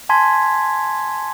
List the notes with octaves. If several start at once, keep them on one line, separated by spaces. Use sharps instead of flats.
G#5 A5 C6 G#6 B6